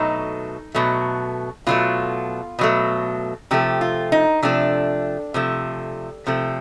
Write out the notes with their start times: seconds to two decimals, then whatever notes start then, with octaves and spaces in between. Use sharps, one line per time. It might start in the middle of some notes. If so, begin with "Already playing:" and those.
Already playing: B2 F#3 A3 D#4
0.75 B2 F#3 A3
1.67 B2 F#3 A3 F4
2.59 B2 F#3 A3
3.51 C3 F3 A3 G4
3.81 F4
4.12 D#4
4.42 C3 F3 A3 D4
5.34 C3 F3 A3
6.27 C3 F3 A3